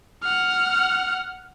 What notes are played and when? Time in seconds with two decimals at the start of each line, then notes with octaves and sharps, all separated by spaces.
0.23 F#5 F6